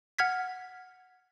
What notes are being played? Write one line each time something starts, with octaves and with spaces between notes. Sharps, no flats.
F#5 F6 G#6 B6